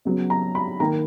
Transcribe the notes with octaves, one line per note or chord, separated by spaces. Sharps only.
C#3 F#3 B3
A#5
B5
D#3 A#3 A#5